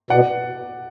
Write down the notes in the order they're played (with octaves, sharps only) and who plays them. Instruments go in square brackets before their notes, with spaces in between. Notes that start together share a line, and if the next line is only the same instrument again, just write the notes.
[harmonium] B2 [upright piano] D5 F#5